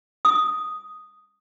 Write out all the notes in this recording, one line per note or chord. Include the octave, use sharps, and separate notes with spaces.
D#6